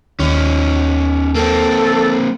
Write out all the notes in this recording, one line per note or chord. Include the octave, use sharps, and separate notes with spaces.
D#2 C#4 D#4
A#3 C4 A4